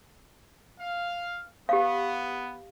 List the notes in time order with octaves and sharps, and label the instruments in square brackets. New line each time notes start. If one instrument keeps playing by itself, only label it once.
[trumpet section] F5
[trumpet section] B3 [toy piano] G4 F5